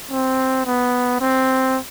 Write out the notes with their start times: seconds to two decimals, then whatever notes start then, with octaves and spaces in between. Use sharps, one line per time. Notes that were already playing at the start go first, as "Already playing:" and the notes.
0.12 C4
0.66 B3
1.21 C4